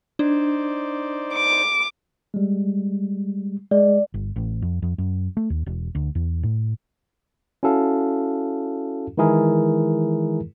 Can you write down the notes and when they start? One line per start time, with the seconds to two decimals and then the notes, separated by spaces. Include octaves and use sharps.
0.19 D4 D#4 C5 D5
1.34 D6
2.34 G3 G#3
3.71 G#3 D5
4.14 G1
4.36 A1
4.62 F2
4.82 F2
4.98 F#2
5.37 A3
5.50 D#2
5.66 E1
5.95 D2
6.15 E2
6.43 A2
7.63 C#4 E4 F#4 A4 F5
9.18 D#3 E3 G#3 E4 G#4 A#4